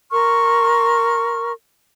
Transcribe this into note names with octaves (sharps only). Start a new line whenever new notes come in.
A#4 C6 C#6 F6